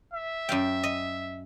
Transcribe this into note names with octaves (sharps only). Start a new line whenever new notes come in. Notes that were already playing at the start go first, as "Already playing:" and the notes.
E5
F#2 F5 G5
D#5